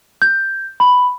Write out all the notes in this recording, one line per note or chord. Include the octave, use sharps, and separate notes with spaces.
G6
B5